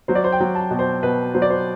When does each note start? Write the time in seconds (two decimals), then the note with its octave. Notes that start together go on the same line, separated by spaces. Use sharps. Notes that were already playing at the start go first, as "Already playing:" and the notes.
0.08 F#3 C5
0.15 D5
0.24 C5
0.32 G5
0.40 F#3
0.55 A5
0.71 B2
0.79 C5
1.03 B2 B4
1.34 F#3 C5
1.42 D5
1.50 C5